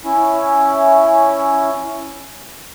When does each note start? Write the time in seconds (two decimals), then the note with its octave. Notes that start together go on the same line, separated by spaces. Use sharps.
0.04 C#4 E4